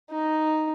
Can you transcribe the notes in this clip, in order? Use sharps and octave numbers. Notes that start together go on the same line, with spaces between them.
D#4